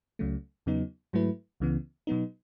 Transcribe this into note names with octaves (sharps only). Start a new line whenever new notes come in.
C#2 C#3 F#3 A3
E2 C#3 F#3 B3 D#4
G#2 F#3 A3 E4 B4
C#2 C#3 E3 B3
B2 F#3 B3 D#4